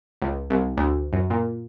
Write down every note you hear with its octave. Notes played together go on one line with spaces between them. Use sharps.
C#2
C2
D2
F#2
A#2